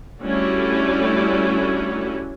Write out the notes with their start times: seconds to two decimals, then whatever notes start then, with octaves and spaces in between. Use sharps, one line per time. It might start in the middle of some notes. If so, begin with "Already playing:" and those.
0.21 G3 A3 C#4 D4 E4 F#4